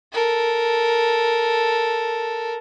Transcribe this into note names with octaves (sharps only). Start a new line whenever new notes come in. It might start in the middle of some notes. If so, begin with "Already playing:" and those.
A4 A#4